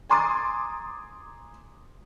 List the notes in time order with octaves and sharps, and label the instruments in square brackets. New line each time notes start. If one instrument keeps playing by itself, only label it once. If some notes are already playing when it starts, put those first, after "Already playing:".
[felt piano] G#5 A#5 C6 D6 D#6 A6